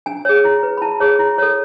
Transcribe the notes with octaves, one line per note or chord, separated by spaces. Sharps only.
D4 G#5
G#4 C#5
E4
B4
B5
E4 A5
G#4 C#5
E4
A4 C#5